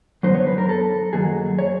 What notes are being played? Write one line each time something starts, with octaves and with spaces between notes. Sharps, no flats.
F#2 D3 F#3 B3 D#4 C5
C#5
B4
A#4
A4
F#2 D#3 F#3 A#3 G#4
C#5